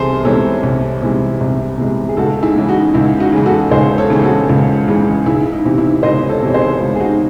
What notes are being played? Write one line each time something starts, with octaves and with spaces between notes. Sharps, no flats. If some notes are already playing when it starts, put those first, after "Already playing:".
Already playing: C2 C3 E3 G#4 A4 C5
C3 E3 G#3 A4 C#5
C2
C3 E3 G#3
C2
C3 E3 G#3
G#4
C#2 F#4 A4
E4 G#4
C#3 E3 G#3
D#4 F#4
C#2 E4
D#4 F#4
C#3 E3 G#3
F#4 A4
C#2 G#4 C5
A4 C#5
C#3 E3 G#3
F#4 A4
C#2
C#3 E3 G#3
C#2 E4 G#4
D#4
C3 E3
E4
C#2 C5 D#5
A4 C#5
C3 E3 C#5
G#4 C5
C#2
G#4
D#4 F#4